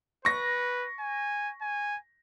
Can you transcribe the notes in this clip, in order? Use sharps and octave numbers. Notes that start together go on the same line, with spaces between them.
B4 C#6 A#6
G#5
G#5